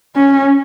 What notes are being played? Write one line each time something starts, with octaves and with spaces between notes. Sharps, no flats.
C#4